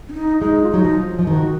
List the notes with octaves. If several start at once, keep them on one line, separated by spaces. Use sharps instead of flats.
C#4
D#4
G#3 D#4
F4
F#3 D#4
F3
F3
D#3 F#4